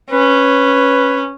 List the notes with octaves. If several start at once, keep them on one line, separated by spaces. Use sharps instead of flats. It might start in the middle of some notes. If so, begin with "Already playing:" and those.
C#4 B4